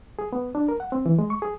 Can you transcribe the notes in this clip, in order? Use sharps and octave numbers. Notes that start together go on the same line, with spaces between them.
G#4
B3
D4
A#4
F#5
C4
E3
G#3
C#6
G#4